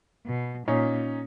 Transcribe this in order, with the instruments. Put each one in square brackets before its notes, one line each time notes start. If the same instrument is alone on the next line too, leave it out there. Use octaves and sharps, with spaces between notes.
[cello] B2
[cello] A#2 [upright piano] C#4 D#4